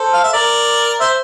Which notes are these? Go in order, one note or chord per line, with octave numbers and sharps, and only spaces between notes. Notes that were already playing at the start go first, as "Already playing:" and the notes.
Already playing: A4 C5
F5
E5
A#4 D5
C5 E5